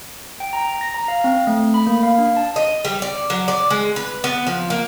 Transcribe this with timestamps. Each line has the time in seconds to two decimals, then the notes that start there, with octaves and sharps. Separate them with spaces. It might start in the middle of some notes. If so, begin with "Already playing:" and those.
0.40 G5
0.53 A#5
0.81 A#6
0.94 A#5
1.08 F5
1.24 C4
1.47 A3
1.74 B5
1.86 A#3
2.03 F5
2.18 D4
2.37 A5
2.56 D#5
2.85 G3
3.02 D5
3.30 F#3
3.48 D5
3.70 G#3
3.96 B4
4.24 B3
4.47 F3
4.70 A#3